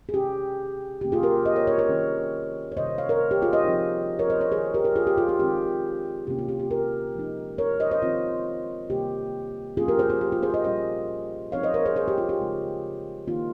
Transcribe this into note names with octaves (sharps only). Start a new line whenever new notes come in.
G#4
C3 D#3 G#3 C#4 G4
C3 D#3 A#3 C#4 G4
F4 G#4
G4 A#4
C5 D#5
A#4 C#5
A#4 C#5
A#4 C#5
D#3 G3 C#4
C#5
C3 D#3 G3 C5 D#5
C#5 F5
A#4 C#5
G4
F4 G#4
C5 D#5
F3 C4 D#4
A#4 C#5
C5 D#5
A#4 C#5
D#3 A#3 D#4 G#4 C5
G4 A#4
G4 A#4
F4 G#4
G4
F4 G#4
G4
D#3 G#3 C4 D#4 G4
C3 D#3 A#3 C#4 G4
F4
G4
G4
G4 A#4
F3 G#3 D#4
A#4 C#5
C5 D#5
C5 D#5
D#3 G#3 C4 F4
C3 D#3 G3 A#3 G4
F3 A#3 C#4 F4 G#4
G4 A#4
G#4 C5
F4 G#4
G4
F4
G#4 C5
F5
C5 D#5
A#2 G3 C#4 C5 D#5
F3 C4 D#4 C#5 F5
C5 D#5
A#4 C#5
G#4 C5
G#4 C5
G4
F4
G4
C#3 G#3 D#4
D#3 A#3 D#4 F4